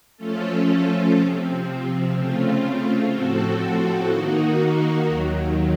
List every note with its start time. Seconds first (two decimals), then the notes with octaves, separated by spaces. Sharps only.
0.17 F3 A3 C#4 F4 A4
1.15 C3 F3 C4
2.13 C#3 A3 C4 F4
3.11 A2 F3 C4 F#4 A4
4.09 D#3 A#3 D#4 F#4
5.07 D#2 D#3 F#3